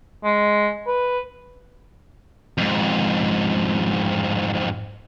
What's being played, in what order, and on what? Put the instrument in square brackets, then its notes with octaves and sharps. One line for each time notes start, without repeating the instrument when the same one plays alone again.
[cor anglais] G#3
B4
[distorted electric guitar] F2 G#2